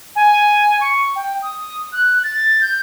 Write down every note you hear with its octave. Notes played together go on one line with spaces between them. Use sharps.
G#5
C#6
G5
D#6
F#6
A6
G6